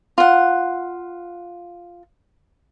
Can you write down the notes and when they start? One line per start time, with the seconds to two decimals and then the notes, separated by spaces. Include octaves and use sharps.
0.18 F4 F#5